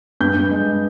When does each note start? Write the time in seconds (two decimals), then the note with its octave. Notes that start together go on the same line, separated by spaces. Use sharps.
0.20 G2 G6
0.35 G2
0.51 G#3